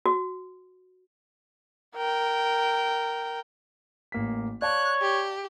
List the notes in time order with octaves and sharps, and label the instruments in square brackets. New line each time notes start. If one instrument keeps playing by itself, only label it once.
[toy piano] F#4
[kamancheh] A#4 G5
[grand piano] A1 A#3 B6
[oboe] C#5 [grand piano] D5 F5 A5 [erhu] F#6
[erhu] G4